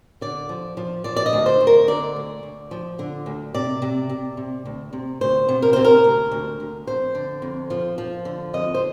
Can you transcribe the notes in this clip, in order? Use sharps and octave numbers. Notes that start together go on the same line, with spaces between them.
D3 D5
F3
F3
F3 D5
D5
D#5
D2
C5
D2
A#4
D3 D5
D2
D2
F3
D3
D2
C3 D5
C3
C3
C3
D2
C3
D2 C5
C3
A#4
C3 C5
A#4
D2
D2
D2
F2 C5
D3
F2
F3
F3
D3
F2 D#5
C5